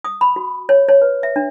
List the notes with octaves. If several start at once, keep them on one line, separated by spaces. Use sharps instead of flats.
D#6
B5
F#4
C#5
C#5
B4
E5
D4